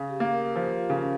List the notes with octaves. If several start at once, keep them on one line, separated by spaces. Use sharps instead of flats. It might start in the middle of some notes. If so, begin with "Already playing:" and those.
Already playing: C#3
G4
A#3
A#4
F3 G4
F4
C#3
C#4